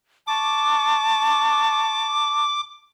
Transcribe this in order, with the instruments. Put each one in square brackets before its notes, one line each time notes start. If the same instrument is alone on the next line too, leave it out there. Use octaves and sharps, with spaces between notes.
[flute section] A5 C#6 [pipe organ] D6